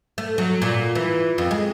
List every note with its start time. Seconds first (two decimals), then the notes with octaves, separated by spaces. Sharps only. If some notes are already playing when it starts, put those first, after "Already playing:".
0.18 A3
0.38 F#3
0.62 A#2
0.95 E3
1.38 F2
1.51 G#3